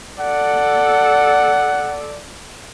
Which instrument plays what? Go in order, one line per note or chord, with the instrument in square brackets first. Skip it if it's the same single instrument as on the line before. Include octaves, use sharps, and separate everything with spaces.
[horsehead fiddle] A4 D5 [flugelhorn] F#5